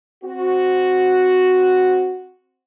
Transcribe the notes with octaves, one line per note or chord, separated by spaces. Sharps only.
C4 F#4